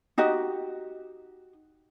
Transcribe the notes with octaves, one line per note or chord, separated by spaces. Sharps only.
D#4 F#4 G4 D#5